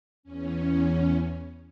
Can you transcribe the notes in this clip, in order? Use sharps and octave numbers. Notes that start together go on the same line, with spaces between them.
E2 C#4